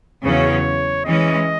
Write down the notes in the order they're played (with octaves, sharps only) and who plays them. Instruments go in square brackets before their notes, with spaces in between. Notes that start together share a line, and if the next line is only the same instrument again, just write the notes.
[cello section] E2 C#3 F#3 C#4 [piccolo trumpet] C#5
[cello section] E3 G#3 C#4 [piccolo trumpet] D#5